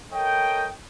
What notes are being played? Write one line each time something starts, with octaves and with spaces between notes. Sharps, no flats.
A4 A#4 C#5 D#5 G5